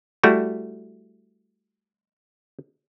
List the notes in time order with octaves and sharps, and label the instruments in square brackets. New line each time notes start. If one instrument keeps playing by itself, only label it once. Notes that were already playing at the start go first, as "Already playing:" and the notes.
[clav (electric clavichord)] G3 A3 E4 F#4